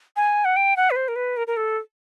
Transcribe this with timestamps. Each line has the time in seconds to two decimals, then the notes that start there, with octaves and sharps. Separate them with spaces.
0.16 G#5
0.45 F#5
0.56 G5
0.76 F#5
0.91 B4
0.96 C5
1.08 A#4
1.16 B4
1.37 A#4
1.47 A#4
1.57 A4